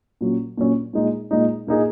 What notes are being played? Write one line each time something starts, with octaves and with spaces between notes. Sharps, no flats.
A#2 F#3 C#4
A#2 F#3 C#4
A#2 G#3 D#4
A#2 G#3 D#4
A#2 A#3 D#4 G#4